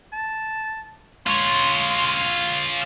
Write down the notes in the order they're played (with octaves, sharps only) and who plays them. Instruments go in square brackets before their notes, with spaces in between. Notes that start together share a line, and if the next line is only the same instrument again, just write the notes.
[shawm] A5
[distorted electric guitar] F4 C#5 [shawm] C6